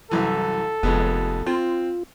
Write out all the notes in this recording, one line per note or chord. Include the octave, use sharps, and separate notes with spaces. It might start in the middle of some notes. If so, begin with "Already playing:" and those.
C2 F#2 E3 A4
F1 F2 G#3 B3
C4 F4